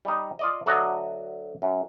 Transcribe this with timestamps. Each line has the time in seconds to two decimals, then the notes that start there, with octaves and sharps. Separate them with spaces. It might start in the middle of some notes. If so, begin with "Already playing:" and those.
0.05 G3 D#4
0.39 F4 D5 D#5
0.66 D2 D3 F#3 F#4 D5 D#5
1.62 F#2